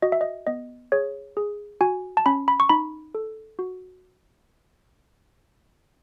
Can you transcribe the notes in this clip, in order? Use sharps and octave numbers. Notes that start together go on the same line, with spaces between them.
F#4 D#5
E5
D#5
B3 D#5
G#4 C#5
G#4
F#4 G#5
A5
C#4 B5
B5
C#6
D#4 B5
A4
F#4